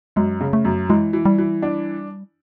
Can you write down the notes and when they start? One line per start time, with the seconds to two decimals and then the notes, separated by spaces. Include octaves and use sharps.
0.16 F#2 G#3
0.41 C#3
0.53 A3
0.65 F#2
0.89 E3 G#3
1.13 E3
1.25 G3
1.38 E3
1.62 D4